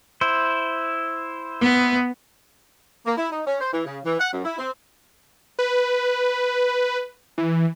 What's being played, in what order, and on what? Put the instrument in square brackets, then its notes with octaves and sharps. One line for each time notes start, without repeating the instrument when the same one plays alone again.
[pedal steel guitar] E4 C5
[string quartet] B3
[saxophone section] A#3
E4
D#4
C#4
C5
E3
C#3
E3
F#5
F#2
E4
C4
[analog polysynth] B4
E3